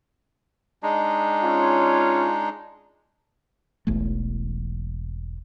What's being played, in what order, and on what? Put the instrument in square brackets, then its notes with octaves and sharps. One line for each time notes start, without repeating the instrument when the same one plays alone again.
[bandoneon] G#3 D4 D#4
[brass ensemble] C#4 F4 C#5
[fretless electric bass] E1 B1 E2 A3